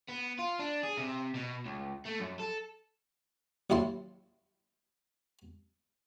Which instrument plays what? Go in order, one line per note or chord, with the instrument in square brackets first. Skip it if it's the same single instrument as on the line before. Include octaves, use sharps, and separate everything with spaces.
[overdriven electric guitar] B3
F4
D4
G#4
C3
B2
C#2
A3
F#2
A4
[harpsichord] A1 D#2 F#3 E4 A5 C6